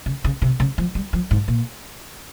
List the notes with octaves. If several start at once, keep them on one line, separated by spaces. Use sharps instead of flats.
C#3
C#3
C3
C#3
F3
G3
F3
G#2
A#2